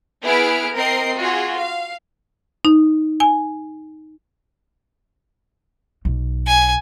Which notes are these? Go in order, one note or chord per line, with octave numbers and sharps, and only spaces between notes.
B3 E4 G#4 B4 F6 D7
C4 A#4 D#5 C7
F4 F#4 G#4
F5
D#4
G#5
B1
G#5